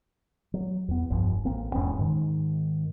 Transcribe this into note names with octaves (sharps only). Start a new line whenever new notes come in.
F#3
E2 B3
F1 C2 G2 F3
A1 A#3 C4
E1 E2 G#2 C#4
G#2 D#3